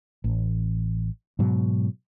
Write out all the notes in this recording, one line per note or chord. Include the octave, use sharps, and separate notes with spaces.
A1
G#2 B2 F#3